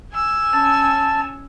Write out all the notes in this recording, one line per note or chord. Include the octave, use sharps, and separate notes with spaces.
G#5 E6
C#4 A5